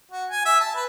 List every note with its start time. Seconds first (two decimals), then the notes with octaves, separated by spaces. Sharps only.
0.11 F#4
0.30 G#5
0.45 E5
0.61 A5
0.75 B4